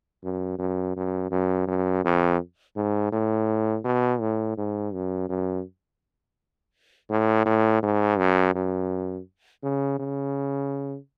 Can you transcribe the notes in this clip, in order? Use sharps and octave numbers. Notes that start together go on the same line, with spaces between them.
F#2
F#2
F#2
F#2
F#2
F2
G#2
A2
B2
A2
G#2
F#2
F#2
A2
A2
G#2
F#2
F#2
C#3
C#3